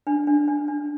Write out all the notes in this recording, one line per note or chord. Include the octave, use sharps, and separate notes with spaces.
D4
D4
D4
D4